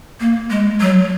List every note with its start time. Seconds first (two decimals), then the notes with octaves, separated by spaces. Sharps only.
0.20 A#3
0.50 G#3
0.80 F#3